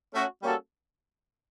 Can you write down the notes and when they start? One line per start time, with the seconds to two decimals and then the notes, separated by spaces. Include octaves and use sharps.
0.13 A3 C#4 F#4
0.43 G3 A#3 C#4 F#4 A4